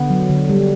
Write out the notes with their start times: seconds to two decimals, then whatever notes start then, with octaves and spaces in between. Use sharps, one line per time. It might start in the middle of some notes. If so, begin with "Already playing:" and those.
Already playing: D3 B3
0.10 F#3
0.30 D3
0.49 G3